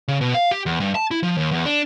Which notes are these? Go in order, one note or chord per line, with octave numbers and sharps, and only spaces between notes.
C#3
B2
F5
G4
E2
G2
A5
E4
F3
D#2
E2
D4